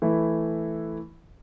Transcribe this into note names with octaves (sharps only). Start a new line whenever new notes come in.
E3 A3 E4